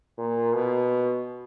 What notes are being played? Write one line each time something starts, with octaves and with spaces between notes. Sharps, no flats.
A#2
B2